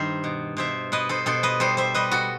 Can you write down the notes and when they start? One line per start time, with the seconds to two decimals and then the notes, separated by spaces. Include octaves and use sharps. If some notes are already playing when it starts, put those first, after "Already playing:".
Already playing: G2 D#3 C5 E5
0.24 B2
0.57 B2 C5 E5
0.92 B2 B4 D#5
1.09 A4 C5
1.26 B2 A4 C5
1.43 B4 D#5
1.60 G3 A4 C5
1.77 C5 E5
1.94 G3 B4 D#5
2.11 F#4 A4